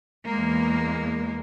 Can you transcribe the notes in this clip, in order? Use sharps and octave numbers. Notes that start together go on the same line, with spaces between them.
E2 G#3 A#3